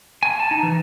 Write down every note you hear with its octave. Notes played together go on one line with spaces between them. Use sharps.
G#5
A5
D#4
E3